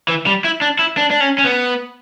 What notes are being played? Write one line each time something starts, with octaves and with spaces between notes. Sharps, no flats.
E3
G3
E4
D4
E4
D4
D4
C#4
C#4
B3